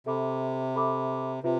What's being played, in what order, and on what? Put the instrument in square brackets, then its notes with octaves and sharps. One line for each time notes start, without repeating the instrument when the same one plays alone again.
[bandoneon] C3 [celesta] A4 E5 B5 D6
[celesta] A4 E5 B5 D6
[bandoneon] C3 [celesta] F4 B4 E5